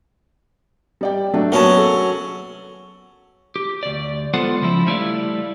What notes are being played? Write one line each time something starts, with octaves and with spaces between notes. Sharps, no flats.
G3 D5 G5
F#3 A3 D4
F#3 A#3 B3 C#4 A5
A4
G4
D2 D5
G#3 B3 F4 A4 C5 F#5
C#3 F3 E4
G3 A3 E4 C#5 D5 F5